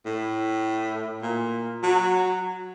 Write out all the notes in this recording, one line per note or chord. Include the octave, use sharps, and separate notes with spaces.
A2
A#2
F#3